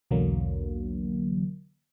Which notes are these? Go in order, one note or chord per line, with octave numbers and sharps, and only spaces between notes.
B1 E2 D3 F#3 A#3